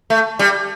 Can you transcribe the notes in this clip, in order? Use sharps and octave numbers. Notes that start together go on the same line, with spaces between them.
A3
G3